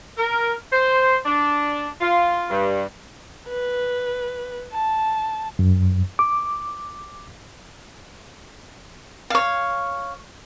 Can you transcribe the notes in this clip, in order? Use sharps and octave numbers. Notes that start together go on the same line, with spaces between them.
A#4
C5
D4
F4
G2
B4
A5
F#2
D6
C#5 F5